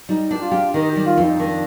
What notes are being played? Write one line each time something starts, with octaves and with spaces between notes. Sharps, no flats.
G3 D#4
D4
G4
F4
G4
D#3 D#4
G4
G3
F4
F2
D#4
D#3 D4